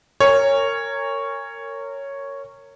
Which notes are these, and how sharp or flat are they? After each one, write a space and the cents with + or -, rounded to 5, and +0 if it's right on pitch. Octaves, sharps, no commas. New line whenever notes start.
A#4 -25 C#5 +0 G#5 -30